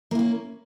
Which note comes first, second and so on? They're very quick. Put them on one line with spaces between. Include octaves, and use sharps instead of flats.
A#3 E4 C#4